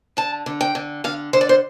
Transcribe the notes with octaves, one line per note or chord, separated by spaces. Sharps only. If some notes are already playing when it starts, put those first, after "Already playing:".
D3 A5
D3
G5
D3
D3 F5
D3 C5
D5
C5